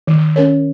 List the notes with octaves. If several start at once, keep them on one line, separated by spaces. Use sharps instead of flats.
D#3
C#4 A#4 C#5